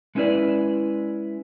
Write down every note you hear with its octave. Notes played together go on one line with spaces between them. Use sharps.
G#3 A3 C#4 E4 B4 D5